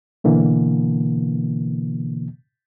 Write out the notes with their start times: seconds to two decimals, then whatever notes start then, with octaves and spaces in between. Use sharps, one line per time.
0.24 B2 D3 E3 A#3